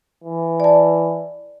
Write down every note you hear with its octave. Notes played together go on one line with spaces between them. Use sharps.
E3
D5 A5